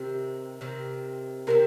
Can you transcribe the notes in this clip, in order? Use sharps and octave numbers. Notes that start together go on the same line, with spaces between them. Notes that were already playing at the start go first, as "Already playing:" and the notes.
Already playing: C3 D#3 C4
C3 D#3 C4
C3 D#3 C4 A#4